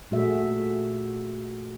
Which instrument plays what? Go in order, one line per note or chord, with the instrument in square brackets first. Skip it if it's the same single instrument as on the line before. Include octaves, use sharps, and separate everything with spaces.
[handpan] A#2 A3 F#4 G#4 E5